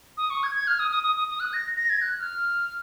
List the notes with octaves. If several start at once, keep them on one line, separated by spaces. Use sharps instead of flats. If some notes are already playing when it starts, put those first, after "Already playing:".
D#6
C#6
G#6
G#6
F6
D#6
D#6
D#6
D#6
D#6
F#6
A#6
A#6
G#6
F#6
F6